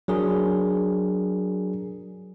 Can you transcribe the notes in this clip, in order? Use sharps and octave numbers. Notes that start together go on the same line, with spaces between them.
F#3 D4 G#4 A#4